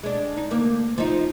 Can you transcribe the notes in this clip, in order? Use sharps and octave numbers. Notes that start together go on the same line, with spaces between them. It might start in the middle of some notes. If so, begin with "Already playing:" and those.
G#3 D4
D#4
D2 A#3
F3 D#4